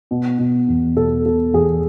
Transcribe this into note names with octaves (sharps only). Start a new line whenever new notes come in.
B2
B2
E2
B2 A4
B2 A4
E2 G#4